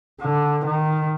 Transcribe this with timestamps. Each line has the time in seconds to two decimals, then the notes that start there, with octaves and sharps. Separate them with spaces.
0.21 D3
0.65 D#3